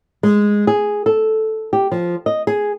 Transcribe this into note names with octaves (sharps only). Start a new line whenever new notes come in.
G#3
G#4
A4
G4
F3
D#5
G#4